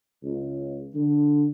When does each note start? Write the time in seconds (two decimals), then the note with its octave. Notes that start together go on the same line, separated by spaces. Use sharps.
0.23 C#2
0.94 D3